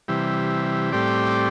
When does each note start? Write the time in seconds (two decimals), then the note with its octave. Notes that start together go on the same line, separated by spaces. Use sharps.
0.08 C3 E3 G3
0.92 A2 G3 C4 G4 D5